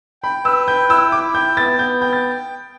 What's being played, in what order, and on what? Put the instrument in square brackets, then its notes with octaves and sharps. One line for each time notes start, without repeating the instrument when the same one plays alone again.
[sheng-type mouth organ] G5 [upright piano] B5
[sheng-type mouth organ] B4 [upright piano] E6
[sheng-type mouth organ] G5 [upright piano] G6
[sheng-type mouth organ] E4 [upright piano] E6
[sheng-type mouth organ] E4 [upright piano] D6
[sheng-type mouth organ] G5 [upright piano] G6
[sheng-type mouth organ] B3 [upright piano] A6
[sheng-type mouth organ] B3 [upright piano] G6
[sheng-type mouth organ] G5 [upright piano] G6
[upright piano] A6